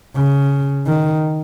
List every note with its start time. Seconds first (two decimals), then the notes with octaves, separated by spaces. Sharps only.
0.15 C#3
0.87 D#3